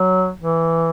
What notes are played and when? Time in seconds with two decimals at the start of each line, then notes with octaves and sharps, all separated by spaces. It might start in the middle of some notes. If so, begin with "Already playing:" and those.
Already playing: F#3
0.39 E3